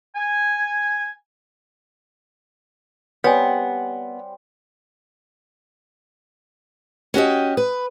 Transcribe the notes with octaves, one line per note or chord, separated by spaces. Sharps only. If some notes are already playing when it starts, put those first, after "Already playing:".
G#5
G3 B3 C4 C#5 G#5 B5
C#4 F#4 G4 D#5
B4